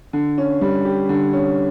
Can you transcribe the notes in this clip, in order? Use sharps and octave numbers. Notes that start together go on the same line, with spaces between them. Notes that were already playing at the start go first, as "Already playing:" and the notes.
D3
C#4
G3
G4
D3
C#4